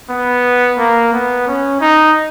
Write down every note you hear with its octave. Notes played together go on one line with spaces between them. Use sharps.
B3
A#3
B3
C#4
D#4